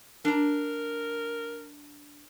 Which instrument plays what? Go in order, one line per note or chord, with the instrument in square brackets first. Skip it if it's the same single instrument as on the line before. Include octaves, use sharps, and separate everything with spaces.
[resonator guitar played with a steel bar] D4 A#5 [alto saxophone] A#4